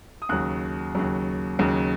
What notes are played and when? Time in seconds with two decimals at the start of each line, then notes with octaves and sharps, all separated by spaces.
0.22 D#6
0.29 D#2 C#3 F#3 F#6
0.95 D#2 C#3 F#3
1.59 D#2 C#3 F#3